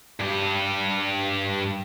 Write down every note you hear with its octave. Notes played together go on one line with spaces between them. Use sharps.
G2 G4